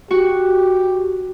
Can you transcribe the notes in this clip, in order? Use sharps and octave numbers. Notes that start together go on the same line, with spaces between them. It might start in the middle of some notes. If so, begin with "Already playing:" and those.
F#4 G4